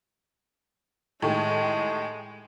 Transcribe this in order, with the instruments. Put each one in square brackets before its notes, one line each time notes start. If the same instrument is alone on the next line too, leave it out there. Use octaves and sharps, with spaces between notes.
[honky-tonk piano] A2 D#3 G4 [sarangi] G#3